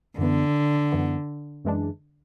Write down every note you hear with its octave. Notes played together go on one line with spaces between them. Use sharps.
F#2 D3 E3 B3
F#2 E3 B3
F#2 E3 G#3 D4